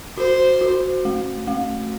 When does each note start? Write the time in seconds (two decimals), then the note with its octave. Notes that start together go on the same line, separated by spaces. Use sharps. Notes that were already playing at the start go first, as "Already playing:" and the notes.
0.17 F#4 C5
0.61 F#4
1.05 A3
1.47 A3